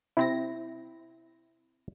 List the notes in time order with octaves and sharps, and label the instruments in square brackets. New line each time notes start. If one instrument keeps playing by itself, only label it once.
[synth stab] C3 C4 A#6 [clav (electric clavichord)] E4